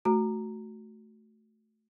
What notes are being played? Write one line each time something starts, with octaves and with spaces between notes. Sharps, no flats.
A3 F#4 A#5